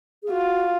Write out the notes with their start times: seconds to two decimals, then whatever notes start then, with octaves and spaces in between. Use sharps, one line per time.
0.23 G#4
0.30 F4 F#4